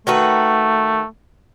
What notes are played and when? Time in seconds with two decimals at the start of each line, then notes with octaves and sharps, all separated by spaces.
0.07 D#3 A3 F#4 B4